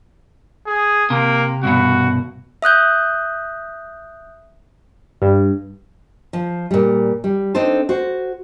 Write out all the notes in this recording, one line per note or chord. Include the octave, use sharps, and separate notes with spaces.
G#4
C3 A#3
C2 G2 B2 F#4
E5 D#6 F#6 G6
G2
F3
A#2 G3
G3
C4 D4 D#4 A4 C5
F#4 C5